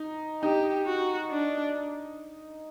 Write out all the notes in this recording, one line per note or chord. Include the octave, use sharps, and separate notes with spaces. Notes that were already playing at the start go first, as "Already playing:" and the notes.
Already playing: D#4
D#4 G4
F#4
D4